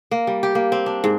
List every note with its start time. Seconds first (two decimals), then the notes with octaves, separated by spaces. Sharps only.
0.11 A#3
0.27 G3
0.43 G4
0.55 A#3
0.72 C4
0.86 D4
1.04 G#2